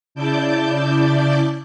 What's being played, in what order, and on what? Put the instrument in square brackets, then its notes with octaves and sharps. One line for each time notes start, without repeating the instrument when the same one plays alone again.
[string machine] C#3 E4 D5 A5 D6 G6